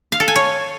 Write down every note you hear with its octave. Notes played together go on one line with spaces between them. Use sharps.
F5
A4
G#5
C#5